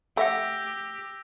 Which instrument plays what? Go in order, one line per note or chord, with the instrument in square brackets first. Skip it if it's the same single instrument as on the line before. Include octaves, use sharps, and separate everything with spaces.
[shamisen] A3 E5 F#5 [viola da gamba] G4 [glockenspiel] E6 A#6